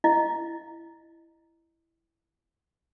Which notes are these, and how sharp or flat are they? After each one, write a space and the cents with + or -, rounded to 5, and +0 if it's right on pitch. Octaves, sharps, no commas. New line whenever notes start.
E4 +10 D#5 -15